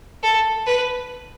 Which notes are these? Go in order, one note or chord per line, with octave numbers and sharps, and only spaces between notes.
A4
B4